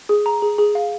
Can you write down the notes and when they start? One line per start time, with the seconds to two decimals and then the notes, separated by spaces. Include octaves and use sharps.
0.09 G#4
0.26 A#5
0.42 G#4
0.58 G#4
0.75 F5